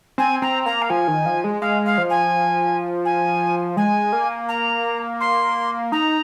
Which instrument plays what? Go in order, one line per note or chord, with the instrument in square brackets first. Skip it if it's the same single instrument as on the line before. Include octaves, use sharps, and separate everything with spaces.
[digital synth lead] C4 [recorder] G#5
[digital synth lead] C4 [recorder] A#5
[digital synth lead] A#3 [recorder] A#5
[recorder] F5
[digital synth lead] F3 [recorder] G#5
[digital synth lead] D#3
F3
G#3
[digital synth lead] G#3 [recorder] F5
[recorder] F5
[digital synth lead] F3
[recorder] G#5
G#5
[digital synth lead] G#3 [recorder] G#5
[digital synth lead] A#3
[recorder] A#5
C6
[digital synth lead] D#4 [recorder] A#5